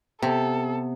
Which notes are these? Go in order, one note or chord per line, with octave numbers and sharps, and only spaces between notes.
C3 B3 A4